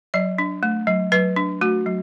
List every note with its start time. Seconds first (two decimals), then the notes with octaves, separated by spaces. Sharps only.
0.14 F#3 D5
0.38 D4
0.63 A3
0.87 F#3
1.12 F#3 B4
1.36 D4
1.61 A3 F#4
1.86 F#3